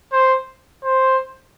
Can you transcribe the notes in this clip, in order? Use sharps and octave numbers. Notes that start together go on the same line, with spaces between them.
C5
C5